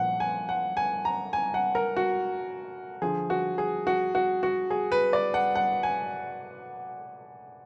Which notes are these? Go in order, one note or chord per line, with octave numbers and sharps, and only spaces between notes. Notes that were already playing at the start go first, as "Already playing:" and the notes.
Already playing: A#2 F3 F#5
G#5
F#5
G#5
A#5
G#5
F#5
A#4
F#4
D3 F3 G#4
F#4
G#4
F#4
F#4
F#4
G#4
B4
D5
F#5
F#5
G#5